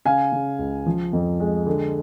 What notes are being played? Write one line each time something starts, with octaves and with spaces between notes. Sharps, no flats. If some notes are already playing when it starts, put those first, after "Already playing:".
C#3 F5 G#5
C#3
C#2
F3
F2
G#3
D3